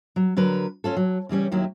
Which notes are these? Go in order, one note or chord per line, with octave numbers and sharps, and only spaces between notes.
F#3
D3 F#3 A#4 B4
C#4 F4 A4
F#3
C#3 E3 G3 C#4
D#2 D#3 F#3 E4